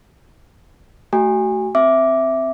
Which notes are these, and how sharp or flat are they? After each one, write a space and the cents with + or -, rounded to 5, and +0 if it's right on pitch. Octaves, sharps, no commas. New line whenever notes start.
A3 +0 F#4 +30 G#5 -30
C4 +0 E5 +0 D6 -5